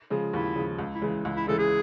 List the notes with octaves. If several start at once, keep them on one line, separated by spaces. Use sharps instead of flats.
C#3 F3 G#3
D#2 E4
C#3 F3 G#3
C#2
E4
C#3 E3 G#3
C#2
E4
C#3 E3 G#3 A4
G#4